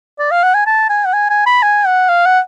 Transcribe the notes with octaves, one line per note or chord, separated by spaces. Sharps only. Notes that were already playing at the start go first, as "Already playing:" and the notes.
D5
F5
F#5
G#5
A5
G#5
F#5
G#5
G#5
B5
G#5
F#5
F5
F#5